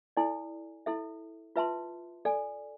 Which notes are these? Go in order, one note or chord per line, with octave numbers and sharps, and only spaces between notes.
E4 A4 D5 G#5
E4 A4 E5
F4 B4 E5 A5 C6
A4 D5 G#5